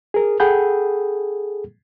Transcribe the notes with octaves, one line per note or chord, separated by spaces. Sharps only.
G#4 A#4
G#4 A4 F#5 G5 B5 G6